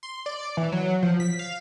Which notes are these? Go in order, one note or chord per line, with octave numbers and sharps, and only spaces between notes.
C6
D5
E3
F#3
F3
B6
F5